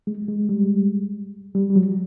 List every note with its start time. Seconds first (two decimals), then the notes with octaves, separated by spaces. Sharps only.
0.07 G#3
0.28 G#3
0.49 G3
1.55 G3
1.70 G3
1.76 F#3